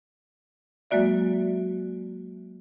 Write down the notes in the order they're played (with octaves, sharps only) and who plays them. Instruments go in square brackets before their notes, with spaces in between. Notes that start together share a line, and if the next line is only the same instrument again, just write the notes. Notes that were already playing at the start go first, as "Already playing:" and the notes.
[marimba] F#3 G#3 A#3 F#4 D5 E5